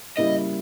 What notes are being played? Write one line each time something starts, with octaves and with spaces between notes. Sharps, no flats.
C#3 G3 A#3 E4 D#5